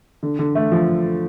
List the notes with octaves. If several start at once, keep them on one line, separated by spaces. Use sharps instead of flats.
D3
D3
A3
F3